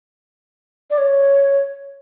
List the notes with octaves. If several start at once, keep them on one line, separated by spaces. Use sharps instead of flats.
D5
C#5